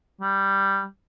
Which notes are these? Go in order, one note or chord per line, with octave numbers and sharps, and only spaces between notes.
G3